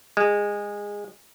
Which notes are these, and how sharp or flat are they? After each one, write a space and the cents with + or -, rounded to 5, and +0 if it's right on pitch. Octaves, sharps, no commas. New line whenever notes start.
G#3 -20